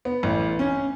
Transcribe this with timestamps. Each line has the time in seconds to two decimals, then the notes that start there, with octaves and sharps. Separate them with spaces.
0.05 B3
0.23 A1
0.59 C#4